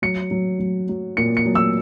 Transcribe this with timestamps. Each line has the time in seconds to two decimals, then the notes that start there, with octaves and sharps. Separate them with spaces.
0.02 F#3 C#7
0.31 F#3
0.59 F#3
0.89 F#3
1.17 A#2 C#7
1.37 C#7
1.45 F#3
1.55 E6